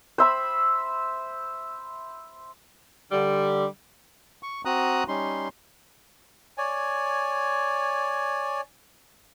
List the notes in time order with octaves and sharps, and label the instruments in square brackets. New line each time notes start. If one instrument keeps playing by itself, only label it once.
[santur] C5 E5 B5
[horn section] D3 G3
[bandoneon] C#6
C4 F#4 A#5 D#6 F#6
G3 C#4 D#4 C6
[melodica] C#5 D5 G#5